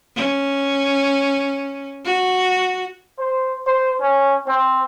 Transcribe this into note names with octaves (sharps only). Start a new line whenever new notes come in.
C#4
F#4
C5
C5
C#4
C4